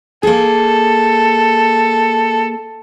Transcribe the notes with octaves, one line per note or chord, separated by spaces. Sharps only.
A#3 G#4 A4